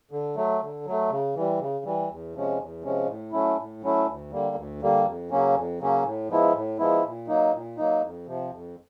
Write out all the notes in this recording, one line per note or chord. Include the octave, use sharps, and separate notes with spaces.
D3
F#3 A3
D3
F#3 A3
C#3
E3 G3
C#3
E3 G3
E2
C3 F3 G#3 C#4
E2
C3 F3 G#3 C#4
A2
F#3 A3 C#4 E4
A2
F#3 A3 C#4 E4
D2
D3 G3 A#3
D2
D3 G3 A#3
F2
C#3 F#3 A#3 C#4
F2
C#3 F#3 A#3 C#4
A2
F3 G#3 B3 E4
A2
F3 G#3 B3 E4
A#2
F#3 A#3 D#4
A#2
F#3 A#3 D#4
F2
C3 F3
F2